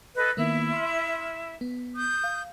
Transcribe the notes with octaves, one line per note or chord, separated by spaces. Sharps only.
A4 B4 D#5
D#3 A#3 B3 E4 E5
C6 F6
B3
D#6 G6
F5